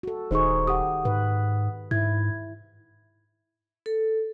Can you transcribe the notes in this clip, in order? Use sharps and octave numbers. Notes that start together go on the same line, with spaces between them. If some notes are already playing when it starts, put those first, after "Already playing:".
F#4 A4
D#1 D#3 D#4 G#4 C5 C#6
G4 F#5 D#6
G#2 B4
G#2 E4 G#6
A4